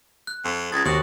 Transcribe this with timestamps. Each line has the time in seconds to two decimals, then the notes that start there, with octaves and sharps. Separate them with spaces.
0.27 F#6
0.45 F2
0.72 C#2 G#4 A6 A#6
0.85 D#2 C3 F#4 D#6 F#7